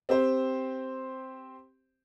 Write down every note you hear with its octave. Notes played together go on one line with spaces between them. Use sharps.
C4 G4 C5